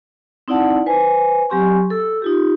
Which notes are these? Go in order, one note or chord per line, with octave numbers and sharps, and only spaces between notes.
C4 D#4 E4 D5 F#5 A5
B4 C5 G#5
F#3 C4 G4 G#5 C6 C#6
A4 E6
D#4 F4 G4